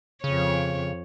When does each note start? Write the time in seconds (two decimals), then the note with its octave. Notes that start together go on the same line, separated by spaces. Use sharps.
0.24 F2 C#3 C#5